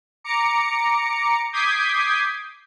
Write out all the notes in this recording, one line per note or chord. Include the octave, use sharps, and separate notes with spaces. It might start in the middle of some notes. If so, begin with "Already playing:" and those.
A#5 D6 C#7
D6 D#6 G6 G#6 B6 C7